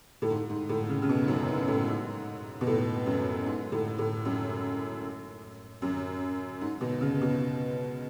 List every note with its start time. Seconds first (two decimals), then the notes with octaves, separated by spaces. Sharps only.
0.22 A2
0.30 G#2
0.49 G#2
0.69 A2
0.89 C#3
1.02 C#3
1.09 B2
1.24 G#2
1.28 F#2
1.48 G#2
1.68 A2
1.88 G#2
2.61 B2
2.67 A2
3.06 F#2
3.46 G#2
3.72 A2
3.98 A2
4.25 F#2
5.82 F#2
6.61 G#2
6.81 B2
7.01 C#3
7.21 B2